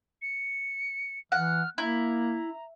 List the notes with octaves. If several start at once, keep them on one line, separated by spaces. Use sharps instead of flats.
C#7
E3 F#5 F6
A#3 E4 A#5